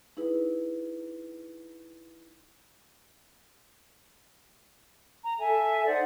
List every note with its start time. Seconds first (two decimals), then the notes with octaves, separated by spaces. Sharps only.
0.17 D#4 E4 G#4 B4
5.23 A#5
5.39 A4 E5 G#5
5.86 D#4 C5 D5 F#5